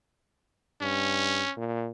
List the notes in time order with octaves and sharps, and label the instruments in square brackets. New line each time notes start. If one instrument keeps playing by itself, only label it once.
[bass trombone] G2 [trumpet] C#4
[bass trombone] A#2